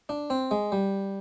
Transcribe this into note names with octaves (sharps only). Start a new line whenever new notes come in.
D4
C4
G#3
G3